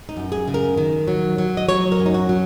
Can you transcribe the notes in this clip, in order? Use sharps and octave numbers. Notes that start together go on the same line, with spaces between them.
D#4
F#2
G#4
C#3
A#4
D#3
F#3
F#3
D#5
F#3 C#5
A#4
F#2
D#4
F#4
F#3